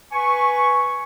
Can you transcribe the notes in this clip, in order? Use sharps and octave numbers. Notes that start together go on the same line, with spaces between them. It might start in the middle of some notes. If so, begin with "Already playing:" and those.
B4 G#5 C#6